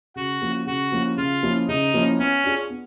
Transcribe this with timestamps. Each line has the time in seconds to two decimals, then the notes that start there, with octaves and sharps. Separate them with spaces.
0.16 C#3 F#4
0.41 F3 A#3 C#4 E4
0.66 C#3 F#4
0.92 F3 A#3 C#4 E4
1.17 C#3 F4
1.43 F3 A#3 C#4 E4
1.68 C#3 D#4
1.94 F3 A#3 C#4 E4
2.18 B3 C#4
2.44 D4 F4 G#4
2.70 B3